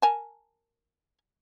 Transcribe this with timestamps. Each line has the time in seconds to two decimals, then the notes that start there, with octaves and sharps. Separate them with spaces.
0.02 A#4 G#5 A5